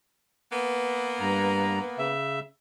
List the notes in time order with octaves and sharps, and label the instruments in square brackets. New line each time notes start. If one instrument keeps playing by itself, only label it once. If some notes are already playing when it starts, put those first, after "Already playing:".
[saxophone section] A#3 B3
[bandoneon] G2 A#5
C#3 E5